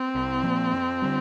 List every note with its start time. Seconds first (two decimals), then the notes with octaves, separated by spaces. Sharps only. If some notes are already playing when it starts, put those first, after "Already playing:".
Already playing: C4
0.15 C2
0.43 A#2 F3 A#3
0.73 F2
1.02 D3 G3